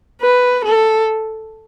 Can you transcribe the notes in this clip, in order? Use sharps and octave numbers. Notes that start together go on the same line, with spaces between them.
B4
A4